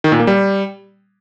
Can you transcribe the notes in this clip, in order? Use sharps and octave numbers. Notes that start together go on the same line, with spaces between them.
D#3
A#2
A#3
G3